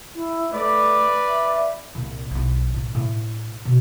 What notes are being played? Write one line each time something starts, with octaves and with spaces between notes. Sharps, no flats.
E4
A3 B4 D5
E5
C2 A#2
B1 E4
A2
A2
B2